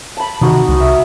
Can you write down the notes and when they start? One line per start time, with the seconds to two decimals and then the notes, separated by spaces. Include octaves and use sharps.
0.17 A5 B5
0.41 C3 D#3 D#4 F#4 D#5
0.68 C2
0.80 E5